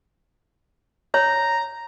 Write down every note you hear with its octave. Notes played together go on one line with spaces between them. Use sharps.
C#5 A#5